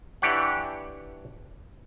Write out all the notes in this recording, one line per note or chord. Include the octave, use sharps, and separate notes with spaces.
E3 D4 G4 C#5 F#5